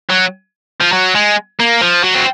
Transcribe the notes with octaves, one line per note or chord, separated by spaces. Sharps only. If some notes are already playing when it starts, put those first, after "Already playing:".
F#3
F3
F#3
G#3
A#3
F3
F#3
C4